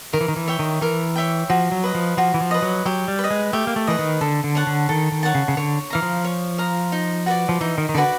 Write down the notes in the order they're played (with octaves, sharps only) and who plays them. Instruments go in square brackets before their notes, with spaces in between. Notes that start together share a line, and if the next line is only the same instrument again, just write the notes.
[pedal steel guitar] D#3 [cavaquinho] A#4
[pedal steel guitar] E3
D#3
E3
[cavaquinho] C#5 E5 G5
[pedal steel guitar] D#3
[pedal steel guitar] E3 [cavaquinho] A#4
[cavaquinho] C#5 E5 G5
[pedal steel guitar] F3 [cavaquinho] F#4
[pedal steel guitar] F#3
[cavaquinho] B4 D#5
[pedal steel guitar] F3
[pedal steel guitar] F3 [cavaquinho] F#4
[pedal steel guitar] E3
F3
[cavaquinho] B4 D#5
[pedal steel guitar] F#3
[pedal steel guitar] F#3 [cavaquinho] G4
[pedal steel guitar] G3
[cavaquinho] B4
D#5
[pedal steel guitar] G#3
[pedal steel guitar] A3 [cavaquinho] G4
[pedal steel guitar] A#3
A3
[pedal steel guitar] E3 [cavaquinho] B4 D#5
[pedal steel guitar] D#3
[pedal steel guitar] D3 [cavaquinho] A4
[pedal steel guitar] D3
[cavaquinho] C#5 F#5 A5
[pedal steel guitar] D3
[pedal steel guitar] D#3 [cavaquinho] A4
[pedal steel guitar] D#3
[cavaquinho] C#5 F#5 A5
[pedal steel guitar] C#3
C#3
[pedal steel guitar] D3 [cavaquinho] C#5
[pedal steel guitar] E3 [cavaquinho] F5 A#5
[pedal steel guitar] F3
[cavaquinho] C#5
F5 A#5
D#4
F#4 B4 D5
[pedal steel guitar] F3
[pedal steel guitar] E3 [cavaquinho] D#4
[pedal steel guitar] D#3
D#3
[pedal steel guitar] D3 [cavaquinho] F#4 B4 D5